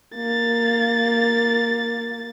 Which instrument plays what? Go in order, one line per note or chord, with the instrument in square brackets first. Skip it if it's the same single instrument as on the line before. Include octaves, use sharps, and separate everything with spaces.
[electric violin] A#3 A6